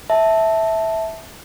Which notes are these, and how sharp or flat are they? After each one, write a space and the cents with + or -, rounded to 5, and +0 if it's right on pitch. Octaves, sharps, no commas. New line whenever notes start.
E5 -10 A5 +0